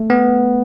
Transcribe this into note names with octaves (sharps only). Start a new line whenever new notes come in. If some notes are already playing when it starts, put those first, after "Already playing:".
Already playing: A3
B3